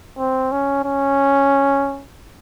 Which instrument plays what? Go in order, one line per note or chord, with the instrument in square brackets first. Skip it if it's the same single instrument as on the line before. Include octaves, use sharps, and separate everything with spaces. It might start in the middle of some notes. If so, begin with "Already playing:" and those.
[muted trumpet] C4
C#4
C#4